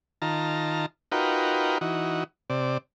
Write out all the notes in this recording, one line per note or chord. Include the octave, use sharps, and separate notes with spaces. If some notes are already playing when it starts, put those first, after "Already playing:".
D#3 F4 A5 A#5
D#4 F4 F#4 A#4 B4 G5
E3 D#4 F#4
C3 D5